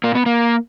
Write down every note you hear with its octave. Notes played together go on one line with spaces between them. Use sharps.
A#2 A#3
B3
A#3